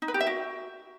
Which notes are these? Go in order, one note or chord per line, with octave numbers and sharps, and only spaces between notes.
D#4
B4
G4
E5
F#4